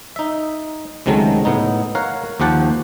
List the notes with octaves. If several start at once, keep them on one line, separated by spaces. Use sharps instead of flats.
D#4 E5
C#2 C3 D#3 F#3 G#3 A3
A2 B3 D#4
A#4 C#5 F5 F#5
D#2 F3 G4 F#5 A5